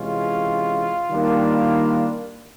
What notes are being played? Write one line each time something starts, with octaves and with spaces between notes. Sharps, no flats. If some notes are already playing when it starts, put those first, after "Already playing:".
Already playing: C3 E3 G#3 C#4 F4
D#3 G3 A#3 D4